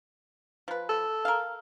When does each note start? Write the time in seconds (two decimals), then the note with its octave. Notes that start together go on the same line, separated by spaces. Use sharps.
0.68 F3 B4
0.89 A4
1.25 A#4 F5